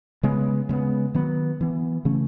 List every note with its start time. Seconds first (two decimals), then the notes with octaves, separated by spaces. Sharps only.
0.23 C#3 G#3 B3
0.69 C#3 G#3 B3
1.14 D#3 F#3 B3
1.61 E3 B3
2.05 C#3 E3 A3 C#4